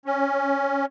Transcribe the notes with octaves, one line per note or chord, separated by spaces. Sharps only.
C#4